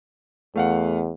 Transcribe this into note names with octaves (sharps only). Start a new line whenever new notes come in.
E2 A3 F5 F#5